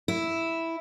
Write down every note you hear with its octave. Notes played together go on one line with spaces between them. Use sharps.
E4